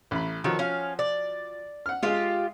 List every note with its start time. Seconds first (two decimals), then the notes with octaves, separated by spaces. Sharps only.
0.11 A1 B5
0.44 D#3 F3 F#3 F#4 A4
0.59 C#4 F5
0.99 D5
1.86 F#5 F6
2.03 G#3 F4 G4 F5